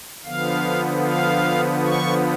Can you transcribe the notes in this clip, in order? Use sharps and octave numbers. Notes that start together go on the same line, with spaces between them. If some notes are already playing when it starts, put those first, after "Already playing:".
D3 F3 B3 F5
F5
C#6